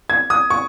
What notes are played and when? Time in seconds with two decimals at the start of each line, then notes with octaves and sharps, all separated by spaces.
0.10 G#6
0.30 D#6
0.50 C#6